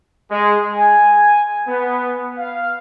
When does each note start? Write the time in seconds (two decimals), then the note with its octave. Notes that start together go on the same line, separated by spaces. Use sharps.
0.31 G#3
0.73 G#5
1.68 B3
2.38 F5